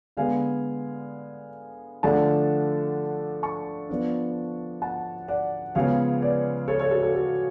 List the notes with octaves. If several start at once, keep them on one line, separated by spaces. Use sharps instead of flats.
D3 G#3 B3 F5 G#5
D3 F3 A3 D4 F#5 A5
A5 C#6
F3 B3 D4
F#5 A5
D5 F#5
C#3 F3 G#3 B3 C#5 F5
B4 D5
A4 C#5
A4 C#5
F#4 A4
F#4 A4
F#4 A4